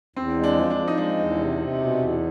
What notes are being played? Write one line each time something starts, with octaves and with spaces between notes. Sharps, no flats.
E2 C4
G#3
D4
F3
D4
F3
D#4
G#3 D4
E2
C3
C3
B2
E2